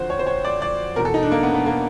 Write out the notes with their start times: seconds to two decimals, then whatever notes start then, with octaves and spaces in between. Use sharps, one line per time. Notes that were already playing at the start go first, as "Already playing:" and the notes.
Already playing: F2 D3 F3 F#4 C5
0.10 C#5
0.19 C5
0.27 C#5
0.45 D5
0.62 D5
0.96 E2 B2 A#4
1.05 A4
1.14 D#4
1.23 D4
1.32 A#3
1.43 B3
1.54 B3
1.66 A#3